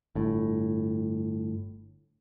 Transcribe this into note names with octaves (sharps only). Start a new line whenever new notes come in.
G1 A2